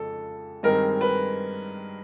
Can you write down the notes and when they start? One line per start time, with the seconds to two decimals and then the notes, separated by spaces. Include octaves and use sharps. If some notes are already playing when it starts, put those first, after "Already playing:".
Already playing: F2 C#3 G#3 A4
0.63 G2 D#3 G#3 C4 A#4
1.01 B4